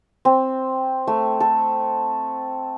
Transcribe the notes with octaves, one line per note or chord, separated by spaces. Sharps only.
C4
A3
A4